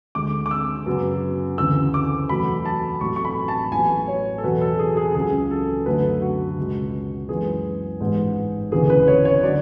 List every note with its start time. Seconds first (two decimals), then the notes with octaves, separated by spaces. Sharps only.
0.15 D2 D3 G#3 D6
0.46 D6
0.51 E6
0.86 F#2 C#3 F#3 B3
1.58 D2 C#3 E3 E6
1.94 D6
2.29 E2 B2 F#3 A3 B5
2.65 A5
3.00 A1 A2 F#3 A3 C#6
3.16 C#6
3.25 B5
3.48 A5
3.72 A1 A2 F#3 B3 G#5
4.08 C#5
4.38 A4
4.44 E2 B2 F#3 B4
4.61 A4
4.79 G#4
4.97 G#4
5.15 C#2 C#3 F#3 G#4
5.51 A4
5.86 F#2 D3 A3 B4
6.22 F#4
6.58 C#2 B2 G#3
7.29 F#2 E3 G#3 B3 G#4
8.00 A1 G#2 G#3 B3
8.72 E1 D2 C#3 E3 B3 G#4
8.90 B4
9.08 C#5
9.25 C#5
9.43 D3 F#3 D5